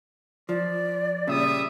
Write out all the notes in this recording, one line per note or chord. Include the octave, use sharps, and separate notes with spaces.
F3 D5
A#2 C#3 G3 E5 D#6